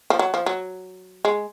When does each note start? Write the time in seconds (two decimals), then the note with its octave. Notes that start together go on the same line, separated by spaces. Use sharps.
0.10 F3
0.19 F#3
0.34 F3
0.46 F#3
1.25 G#3